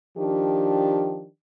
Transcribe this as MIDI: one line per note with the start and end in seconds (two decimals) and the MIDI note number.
0.16 1.27 51
0.16 1.27 53
0.16 1.27 62
0.16 1.27 67